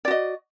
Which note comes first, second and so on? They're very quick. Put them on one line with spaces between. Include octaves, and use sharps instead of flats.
D5 F#4 D#5